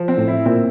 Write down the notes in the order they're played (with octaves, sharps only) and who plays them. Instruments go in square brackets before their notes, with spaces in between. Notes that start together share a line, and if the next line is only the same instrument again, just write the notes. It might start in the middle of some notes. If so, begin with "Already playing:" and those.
Already playing: [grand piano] F3
C4
[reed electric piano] A2
[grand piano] E4
[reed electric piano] A#2 [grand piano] C4